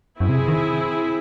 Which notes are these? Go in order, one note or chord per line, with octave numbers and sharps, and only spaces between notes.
F#2 C4 E4 G#4
C3
D#3